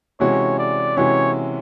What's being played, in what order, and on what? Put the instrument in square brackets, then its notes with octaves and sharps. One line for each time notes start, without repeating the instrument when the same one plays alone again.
[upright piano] C3 E3 G#3 C#4 F#4 [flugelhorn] C#5
[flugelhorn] D5
[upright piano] C3 E3 G#3 C#4 F#4 [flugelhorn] C#5